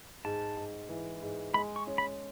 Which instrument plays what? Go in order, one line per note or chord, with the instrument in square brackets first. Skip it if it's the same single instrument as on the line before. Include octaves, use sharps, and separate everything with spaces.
[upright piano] G#2 [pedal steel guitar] A5
[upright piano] G#2
E3
G#2
[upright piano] G#3 [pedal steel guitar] B5
[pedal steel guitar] C#6
[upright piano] C#4
[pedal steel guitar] B5